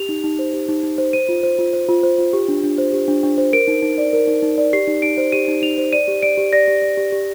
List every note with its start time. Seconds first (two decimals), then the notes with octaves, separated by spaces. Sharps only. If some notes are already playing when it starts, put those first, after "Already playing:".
Already playing: G4 F7
0.09 D#4
0.24 D#4
0.39 C5
0.54 G4
0.69 D#4
0.83 D#4
0.98 C5
1.13 C5 D#7
1.29 F4
1.43 C5
1.59 F4
1.73 C5
1.89 F4
2.03 C5
2.18 F4
2.33 G4
2.48 D4
2.64 D4
2.78 C5
2.93 G4
3.08 D4
3.23 D4
3.38 C5
3.53 A#4 D7
3.68 D#4
3.82 D#4
3.98 D5
4.13 A#4
4.27 D#4
4.42 D#4
4.58 D5
4.73 G4 C7
4.88 D#4
5.02 D#4 D7
5.17 C5
5.32 G4 D#7
5.48 D#4
5.62 D#4 F7
5.78 C5
5.93 D5 D#7
6.08 G4
6.23 D5 D7
6.38 G4
6.53 D5 A#6
6.68 G4
6.82 D5
6.97 G4
7.12 G4